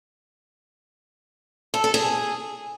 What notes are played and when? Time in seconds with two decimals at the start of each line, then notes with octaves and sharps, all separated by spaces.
1.74 A4
1.84 A4
1.94 G#4